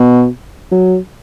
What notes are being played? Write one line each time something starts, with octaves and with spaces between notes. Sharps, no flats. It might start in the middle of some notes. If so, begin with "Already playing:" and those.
Already playing: B2
F#3